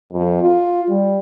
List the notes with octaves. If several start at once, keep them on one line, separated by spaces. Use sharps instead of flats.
F2
F4
G3